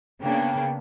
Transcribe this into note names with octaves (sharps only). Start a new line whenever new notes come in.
C#3 A#3 B3 D4 G5